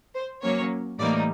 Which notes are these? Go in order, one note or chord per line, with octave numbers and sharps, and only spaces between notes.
C5
F#3 A#3 C#4 C#5
A2 E3 G3 A#3 D#4 D5